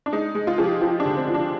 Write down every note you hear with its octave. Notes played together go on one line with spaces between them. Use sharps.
D4
G#3 D#4
G#3
F4
F3 G#4
G4
F3 F4
D4
D3
C4
F3
D4